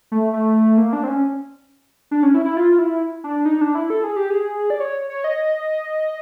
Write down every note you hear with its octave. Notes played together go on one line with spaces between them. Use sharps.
A3
A3
A#3
D4
C4
C#4
D4
C#4
E4
E4
F4
E4
D4
D#4
D4
E4
A4
G#4
G4
G#4
D5
C#5
C#5
D#5